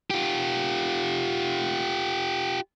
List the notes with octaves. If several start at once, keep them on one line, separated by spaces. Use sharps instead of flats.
F4 G4